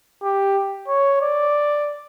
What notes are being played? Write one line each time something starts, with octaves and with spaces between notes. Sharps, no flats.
G4
C#5
D5